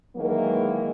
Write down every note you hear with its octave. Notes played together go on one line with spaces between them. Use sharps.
D#3 E3 F#3 G#3 A#3